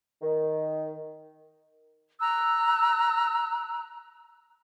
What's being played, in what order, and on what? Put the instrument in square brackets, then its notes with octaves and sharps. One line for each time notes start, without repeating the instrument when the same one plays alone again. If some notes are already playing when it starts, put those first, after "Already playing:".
[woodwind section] D#3
[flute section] A#5 E6 F#6